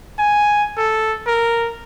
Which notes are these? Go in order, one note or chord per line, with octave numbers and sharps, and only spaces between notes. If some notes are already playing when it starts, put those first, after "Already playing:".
G#5
A4
A#4